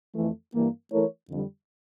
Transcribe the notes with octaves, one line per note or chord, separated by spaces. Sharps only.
F2 E3 A3
G2 E3 A#3
E3 A3 E4 A#4 C#5
F2 D3 G3